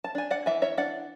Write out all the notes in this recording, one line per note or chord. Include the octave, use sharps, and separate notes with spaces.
A5
D4 G#5
D5 F#5
E3 E5 G#5
C#5 E5
D4 D5 F#5